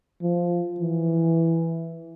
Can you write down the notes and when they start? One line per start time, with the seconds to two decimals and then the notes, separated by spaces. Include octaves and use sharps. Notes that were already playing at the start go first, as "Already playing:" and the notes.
0.22 F3
0.80 E3